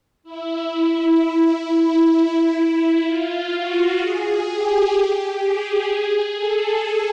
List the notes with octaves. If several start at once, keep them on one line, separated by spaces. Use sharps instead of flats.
E4
E4
F4
F#4
G#4
G4
G#4
A4